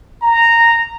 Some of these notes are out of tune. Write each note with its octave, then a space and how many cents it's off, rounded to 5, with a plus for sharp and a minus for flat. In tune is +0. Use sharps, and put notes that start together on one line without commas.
A#5 -10